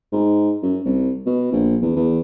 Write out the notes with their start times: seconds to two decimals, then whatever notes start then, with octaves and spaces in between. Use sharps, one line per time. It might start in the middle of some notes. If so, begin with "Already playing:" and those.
0.12 G#2
0.63 F#2
0.85 C2
1.26 B2
1.52 A#1
1.82 E2
1.96 E2